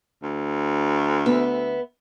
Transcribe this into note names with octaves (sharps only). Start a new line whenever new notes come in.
D2
B3 E5